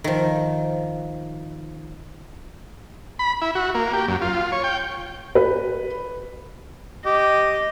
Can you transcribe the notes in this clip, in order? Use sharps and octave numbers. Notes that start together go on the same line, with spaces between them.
D#3 F3
B5
E4
F#4
A#3
G4
F#2
F4
C#5
G5
B4
G4 D#5